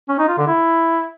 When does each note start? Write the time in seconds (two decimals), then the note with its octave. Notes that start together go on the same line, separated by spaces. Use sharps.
0.09 C#4
0.19 D#4
0.28 F4
0.38 D3
0.47 E4